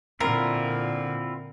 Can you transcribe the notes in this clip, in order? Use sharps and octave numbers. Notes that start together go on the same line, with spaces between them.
A#2 D3 C4 E4 F4 A#4